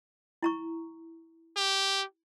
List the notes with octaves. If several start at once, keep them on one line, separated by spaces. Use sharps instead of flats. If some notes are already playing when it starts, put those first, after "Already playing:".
E4 A#5 C#6
G4